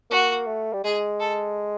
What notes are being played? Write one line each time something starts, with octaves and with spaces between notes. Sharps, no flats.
A#3 F#4
A3
G3
G#3 G#4
A4